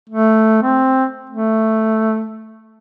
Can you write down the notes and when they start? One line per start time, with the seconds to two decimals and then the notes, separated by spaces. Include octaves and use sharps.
0.10 A3
0.63 C4
1.30 A3